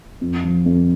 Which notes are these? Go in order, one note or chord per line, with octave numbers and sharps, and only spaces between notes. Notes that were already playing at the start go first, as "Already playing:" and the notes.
F2
F3
F2